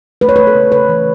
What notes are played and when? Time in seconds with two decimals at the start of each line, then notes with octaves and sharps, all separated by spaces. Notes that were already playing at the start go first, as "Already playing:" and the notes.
0.21 A3 B4
0.29 C#5
0.36 A3 B4
0.47 A4
0.55 C#3
0.72 C#3 B4
0.89 E3